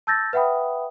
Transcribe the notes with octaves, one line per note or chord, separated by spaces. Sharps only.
A5 E6 G6 A6 A#6
B4 E5 F#5 G5 B5 D#6